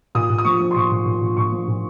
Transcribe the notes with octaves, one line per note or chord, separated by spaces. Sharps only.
A#2 D#6
A#2
D#6
F3 C#6
F3
C6
A#2 C#6
A#2
A#2
A#2
A#2 C#6
F3
A#2